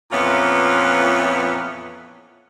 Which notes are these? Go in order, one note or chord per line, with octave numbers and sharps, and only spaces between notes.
F2 A#2 E3 B3 C#4 F4